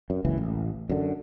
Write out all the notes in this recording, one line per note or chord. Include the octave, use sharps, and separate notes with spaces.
F#2
F#1 C#2 E3
A1
F#2 D3